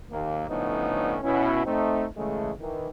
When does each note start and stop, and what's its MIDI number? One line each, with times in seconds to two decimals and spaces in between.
0.11 0.46 39
0.11 0.46 58
0.49 1.17 45
0.49 1.17 50
0.49 1.17 53
0.49 1.17 59
0.49 1.17 61
0.49 1.17 63
1.22 1.64 47
1.22 1.64 61
1.22 1.64 64
1.65 2.05 57
1.65 2.05 60
1.65 2.05 63
2.17 2.51 49
2.17 2.51 52
2.17 2.51 56
2.17 2.51 57
2.60 2.87 51
2.60 2.87 52